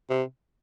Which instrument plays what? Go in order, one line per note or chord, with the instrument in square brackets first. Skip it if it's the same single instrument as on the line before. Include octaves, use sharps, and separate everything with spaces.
[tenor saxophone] C3